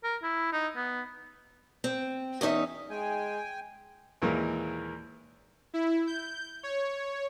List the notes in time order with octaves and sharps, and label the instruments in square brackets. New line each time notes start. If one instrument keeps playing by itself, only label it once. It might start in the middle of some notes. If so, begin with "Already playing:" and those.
[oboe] A#4
E4
D#4
B3
[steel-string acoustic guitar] C4
E2 C#4 D#4 E5
[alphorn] G#3 [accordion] G5 G#5
[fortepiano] D#2 A#2 E3 G#3 A#4
[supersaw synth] E4
G6
C#5